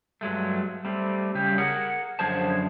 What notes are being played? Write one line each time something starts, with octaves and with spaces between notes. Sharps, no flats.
G2 F#3 G#3 A3
G3 A3 C4
C#3 G3 G4
G#4 A#4 F#5
F#2 D3 F3 G#4 C5 A5